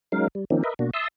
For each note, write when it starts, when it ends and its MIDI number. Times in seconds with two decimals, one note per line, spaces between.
0.12 0.28 54
0.12 0.28 56
0.12 0.28 61
0.12 0.28 63
0.12 0.28 70
0.12 0.28 77
0.35 0.45 55
0.50 0.63 51
0.50 0.63 53
0.50 0.63 58
0.50 0.63 60
0.50 0.63 61
0.50 0.63 63
0.64 0.74 70
0.64 0.74 71
0.64 0.74 75
0.64 0.74 76
0.79 0.90 47
0.79 0.90 58
0.79 0.90 62
0.79 0.90 66
0.94 1.08 76
0.94 1.08 81
0.94 1.08 84
0.94 1.08 87
0.94 1.08 88